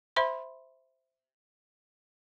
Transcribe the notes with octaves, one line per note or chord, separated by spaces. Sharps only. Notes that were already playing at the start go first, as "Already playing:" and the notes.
C5 E5 B5 C6